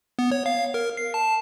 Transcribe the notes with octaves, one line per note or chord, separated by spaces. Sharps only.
B3
C#5
F5
A#4
C7
A5